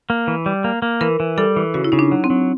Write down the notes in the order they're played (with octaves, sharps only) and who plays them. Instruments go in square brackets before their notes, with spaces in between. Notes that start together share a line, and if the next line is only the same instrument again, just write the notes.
[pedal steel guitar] A#3
E3
G3
A#3
A#3
[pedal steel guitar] E3 [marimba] A#4
[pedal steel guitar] E3
[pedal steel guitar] G3 [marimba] A4
[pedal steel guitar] E3
[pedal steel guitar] C#3 [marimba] F#4
[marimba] E4
[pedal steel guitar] C#3 [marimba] D#4
[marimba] D4
[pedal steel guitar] F#3
[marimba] C4
[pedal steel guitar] F#3